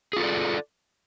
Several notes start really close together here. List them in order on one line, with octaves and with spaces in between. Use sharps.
G#4 F4 A4 D5